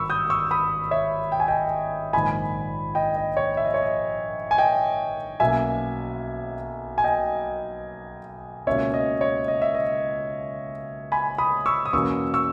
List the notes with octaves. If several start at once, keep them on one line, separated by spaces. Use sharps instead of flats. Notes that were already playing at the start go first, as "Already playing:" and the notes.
Already playing: G#1 G2 B5 C#6 E6
D#6 G6
C#6 E6
B5 D#6
C#5 E5
G5
G#5
D#5 G5
A#1 G#2 D#3 G#5 B5
D#5 G5
D#5
C#5
E5
D#5
C#5
D#5
G#5
D#5 G5
B1 B2 A#3 C#4 E5 G#5
G#5
D#5 G5
C#2 B2 A#3 C#4 C#5 E5
D#5
C#5
D#5
E5
D#5
G#5 B5
B5 D#6
C#6 E6
D#6
E2 B2 A#3 C#4 C#6 E6
C#6 E6